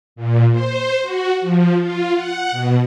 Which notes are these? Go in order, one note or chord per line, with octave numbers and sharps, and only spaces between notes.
A#2
C5
F#4
F3
F4
F#5
B2